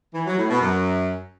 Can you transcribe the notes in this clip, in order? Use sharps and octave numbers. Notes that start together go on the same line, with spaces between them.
E3
F#3
A2
B2
F#2